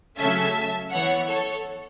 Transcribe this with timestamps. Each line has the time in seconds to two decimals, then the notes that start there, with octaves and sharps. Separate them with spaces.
0.18 C#3 F#3 A3 C#4 E5 A5
0.91 E3 B3 C#5 F#5
1.28 A4 C#5